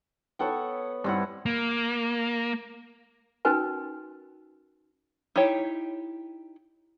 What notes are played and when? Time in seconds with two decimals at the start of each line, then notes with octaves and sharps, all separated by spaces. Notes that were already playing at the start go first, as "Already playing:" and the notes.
0.39 B3 A4 C#5 F#5 G5 C#6
1.04 G2 C4 E4 F#5
1.46 A#3
3.45 C#4 D#4 F#4 A#4 B4 G#5
5.36 D#4 E4 G4 C#5